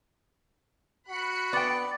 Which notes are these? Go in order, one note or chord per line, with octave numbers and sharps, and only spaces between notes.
F#4 B5 F#6 C#7
B3 D5 G5